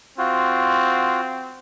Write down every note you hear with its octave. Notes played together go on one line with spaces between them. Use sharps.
C4 F4 F#4